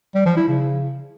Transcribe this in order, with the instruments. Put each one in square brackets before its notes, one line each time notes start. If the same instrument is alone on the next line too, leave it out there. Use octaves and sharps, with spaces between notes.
[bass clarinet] G3
F3
E4
C#3